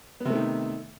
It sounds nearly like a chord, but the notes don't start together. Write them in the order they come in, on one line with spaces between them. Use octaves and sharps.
B3 C3 A3 D#3